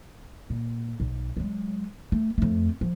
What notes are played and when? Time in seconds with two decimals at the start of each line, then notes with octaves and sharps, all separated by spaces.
0.50 A#2
1.00 B1
1.37 F#3 G#3
2.12 A3
2.38 F2 A3
2.81 F3